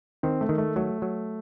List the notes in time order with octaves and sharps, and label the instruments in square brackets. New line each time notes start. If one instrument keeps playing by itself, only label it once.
[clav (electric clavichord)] D#3 [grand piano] C4
[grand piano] A3
[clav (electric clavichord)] D#3
[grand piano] A3
[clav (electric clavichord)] F#3 [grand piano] A3
[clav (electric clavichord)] F#3